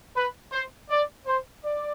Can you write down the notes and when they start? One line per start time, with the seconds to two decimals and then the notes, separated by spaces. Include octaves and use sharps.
0.15 B4
0.52 C5
0.90 D5
1.26 C5
1.64 D5